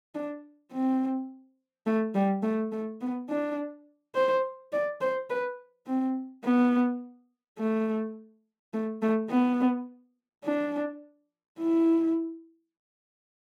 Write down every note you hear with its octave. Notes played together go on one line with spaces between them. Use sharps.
D4
C4
A3
G3
A3
A3
B3
D4
C5
D5
C5
B4
C4
B3
A3
A3
A3
B3
D4
E4